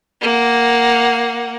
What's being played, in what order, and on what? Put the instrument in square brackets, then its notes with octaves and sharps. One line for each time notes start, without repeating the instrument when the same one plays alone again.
[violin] A#3 F#5